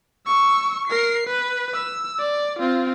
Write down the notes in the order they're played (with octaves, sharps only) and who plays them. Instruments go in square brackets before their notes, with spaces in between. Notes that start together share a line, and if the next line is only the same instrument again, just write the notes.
[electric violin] C#6 E6
A#4 C7
B4
E6
D5
C4 F4